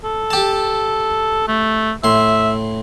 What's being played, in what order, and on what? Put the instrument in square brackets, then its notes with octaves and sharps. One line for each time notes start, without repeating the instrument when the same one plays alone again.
[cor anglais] A4
[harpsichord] G4 A5
[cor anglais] A3
[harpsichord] A2 C6 [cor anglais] E5